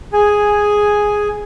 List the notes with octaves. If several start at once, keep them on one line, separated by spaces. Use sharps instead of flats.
G#4 G#5